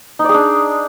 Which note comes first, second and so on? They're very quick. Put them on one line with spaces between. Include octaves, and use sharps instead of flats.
D#4 D5 G#4 D4